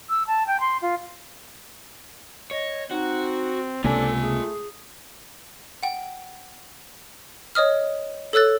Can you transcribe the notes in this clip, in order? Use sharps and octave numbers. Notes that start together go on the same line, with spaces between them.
E6
A5
G5
C6
F4
C#5 D#5
C4 D#4 F#4
C#2 C3 A#3 D4 F4 A4 G#5
A3 G#4
F#5 G5
C#5 D#5 D#6 F6
A4 C#5 E6 F#6 A6